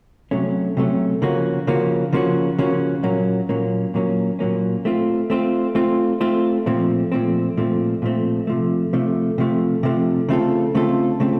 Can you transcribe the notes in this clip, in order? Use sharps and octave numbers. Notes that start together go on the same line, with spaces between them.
C3 F#3 A3 C#4
C3 F#3 A3 C#4
C#3 F3 A#3 C#4 F#4
C#3 F3 A#3 C#4 F#4
C#3 F3 A#3 C#4 F#4
C#3 F3 A#3 C#4 F#4
A#2 F#3 A#3 C#4
A#2 F#3 A#3 C#4
A#2 F#3 A#3 C#4
A#2 F#3 A#3 C#4
A3 C4 F4
A3 C4 F4
A3 C4 F4
A3 C4 F4
A#2 F3 A3 C4
A#2 F3 A3 C4
A#2 F3 A3 C4
A#2 F3 A3 C4
C3 F3 A3
C3 F3 A3
C3 F3 A3
C3 F3 A3
C#3 A3 C4 F4 A4
C#3 A3 C4 F4 A4
C#3 A3 C4 F4 A4